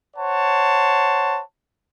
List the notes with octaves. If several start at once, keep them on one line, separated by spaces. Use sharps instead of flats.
C5 C#5 F#5 A5